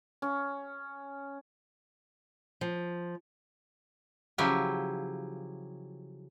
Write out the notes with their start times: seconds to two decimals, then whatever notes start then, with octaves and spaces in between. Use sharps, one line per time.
0.22 C#4
2.61 F3
4.38 C#3 F3 F#3 E4 G4